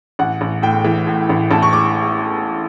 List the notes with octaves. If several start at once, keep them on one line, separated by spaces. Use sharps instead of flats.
A1 F#5
A1
A2 G5
E3
A2
A1
A1 A5
C#6
D6